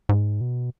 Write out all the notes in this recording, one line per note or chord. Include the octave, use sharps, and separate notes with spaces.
G#2
B2